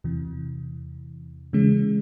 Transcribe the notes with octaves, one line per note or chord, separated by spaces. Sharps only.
E2 C3 E3
C#3 E3 G#3 C#4